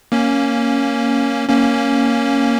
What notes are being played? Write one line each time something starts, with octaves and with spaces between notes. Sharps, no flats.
A#3 C#4
A#3 C#4